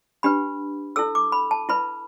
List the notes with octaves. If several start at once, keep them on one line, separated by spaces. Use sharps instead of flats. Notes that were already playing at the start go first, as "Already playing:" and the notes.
D4 G4 B4 B5
E4 A4 E6
D6
B5
A5
E4 B4 B5